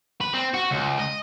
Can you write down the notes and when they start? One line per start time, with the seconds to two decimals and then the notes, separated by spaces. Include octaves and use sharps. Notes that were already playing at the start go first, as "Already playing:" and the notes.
0.21 B4
0.34 C4
0.54 F#4
0.71 C#2
0.99 D#5